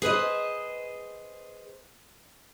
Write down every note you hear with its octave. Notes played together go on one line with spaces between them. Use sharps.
G#4 B4 C5 D#5